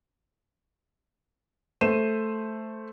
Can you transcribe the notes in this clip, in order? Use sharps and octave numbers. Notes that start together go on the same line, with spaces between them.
A3 C5 D#7 E7